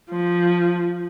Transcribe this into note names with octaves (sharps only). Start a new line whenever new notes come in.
F3